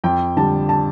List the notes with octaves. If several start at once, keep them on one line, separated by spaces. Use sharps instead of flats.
F2 G5
D3 G3 A5
A5